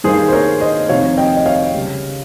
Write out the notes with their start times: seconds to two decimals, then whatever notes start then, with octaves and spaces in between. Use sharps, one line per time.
0.04 G2 D#3 A#3 G#4 C5
0.28 C5
0.33 A#4 C#5
0.60 C5 D#5
0.89 F1 F2 C3 D#3 C#5 F5
1.17 D#5 G5
1.36 D#5
1.46 C#5 F5
1.74 C#2 C#3 G3